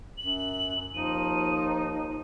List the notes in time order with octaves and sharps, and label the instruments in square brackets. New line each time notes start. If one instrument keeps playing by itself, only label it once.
[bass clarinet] F#2 [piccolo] F#7
[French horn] D#2 [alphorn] F3 [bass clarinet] D#4 [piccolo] D#7